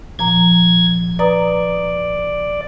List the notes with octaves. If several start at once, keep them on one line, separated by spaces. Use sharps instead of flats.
A#2 F3 A#5 G#6
B4 D5 A#5 D#6